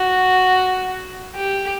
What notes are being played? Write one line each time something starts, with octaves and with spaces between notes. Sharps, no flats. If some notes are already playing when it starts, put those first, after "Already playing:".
Already playing: F#4
G4